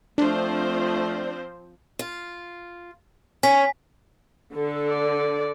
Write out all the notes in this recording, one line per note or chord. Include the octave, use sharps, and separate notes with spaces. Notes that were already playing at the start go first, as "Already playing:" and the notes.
F3 A3 C4 D4 C5
F4
C#4 G#5 B6
D3 A4
D5